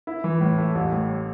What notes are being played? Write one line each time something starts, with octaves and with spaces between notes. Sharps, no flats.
E4
E3
A2
A3
A1
A2